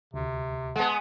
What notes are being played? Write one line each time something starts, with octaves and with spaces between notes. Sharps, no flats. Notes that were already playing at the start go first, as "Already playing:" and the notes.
D2 C3
G#3 B3 F#5 A5